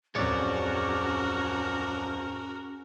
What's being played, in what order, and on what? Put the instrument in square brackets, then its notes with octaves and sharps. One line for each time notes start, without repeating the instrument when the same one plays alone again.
[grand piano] D1 F2 [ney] C#4 [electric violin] F#4 A#4 [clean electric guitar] G#4 C#5 D5